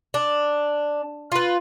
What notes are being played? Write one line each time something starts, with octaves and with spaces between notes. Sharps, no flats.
D4
F4 B4